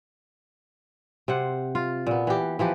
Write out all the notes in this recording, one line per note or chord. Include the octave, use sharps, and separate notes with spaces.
C3 C5 F#5
F4
A#2 B3
E3 G4
E3 F3 G4 B4